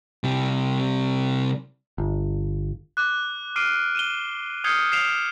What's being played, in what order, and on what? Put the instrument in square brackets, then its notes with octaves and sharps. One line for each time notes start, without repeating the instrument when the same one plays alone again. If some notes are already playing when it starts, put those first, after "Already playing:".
[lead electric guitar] C3 G3
[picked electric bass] G1
[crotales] D6 F#6
D6 F6 C7 D7 D#7
D#7 E7 G7
D#6 F6 G6 G#6 C7 C#7
F6 C7 D7 E7 F7